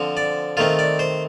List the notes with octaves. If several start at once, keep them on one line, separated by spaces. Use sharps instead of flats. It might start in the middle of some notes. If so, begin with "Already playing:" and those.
Already playing: D3 F3 C4
D5
D#3 A3 C4 F4
D5
C5